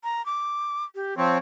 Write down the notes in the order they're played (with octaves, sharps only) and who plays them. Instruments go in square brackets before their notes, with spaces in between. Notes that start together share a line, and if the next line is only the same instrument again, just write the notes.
[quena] A#5
D6
G4
[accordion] F3 C4 [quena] C#5